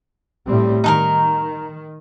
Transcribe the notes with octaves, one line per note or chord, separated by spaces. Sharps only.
A2 G3 C4
D#3 D#4 A4 A#4